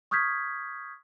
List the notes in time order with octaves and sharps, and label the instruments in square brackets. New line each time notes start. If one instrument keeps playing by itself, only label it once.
[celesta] C#6 D#6 F6 G6 G#6 B6